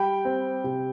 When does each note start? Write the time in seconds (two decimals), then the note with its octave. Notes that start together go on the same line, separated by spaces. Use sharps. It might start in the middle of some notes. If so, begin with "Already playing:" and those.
Already playing: G3 G5 B5
0.25 C4
0.64 C3